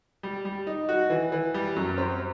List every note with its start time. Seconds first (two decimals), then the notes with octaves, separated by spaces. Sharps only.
0.23 G3
0.45 G3
0.67 D#4
0.89 F#4
1.10 E3
1.32 E3
1.54 G3
1.76 F#2
1.98 C4